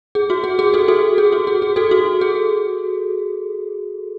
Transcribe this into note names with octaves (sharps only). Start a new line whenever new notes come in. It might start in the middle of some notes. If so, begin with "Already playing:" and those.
G#4
F#4
G#4
G#4
F#4 A4
F#4 A4
G#4
F#4
G#4
G#4
F#4 A4
F#4
G#4